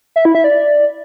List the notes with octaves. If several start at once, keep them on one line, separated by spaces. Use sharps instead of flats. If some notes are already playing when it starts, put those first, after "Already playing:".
E5
E4
E5
D5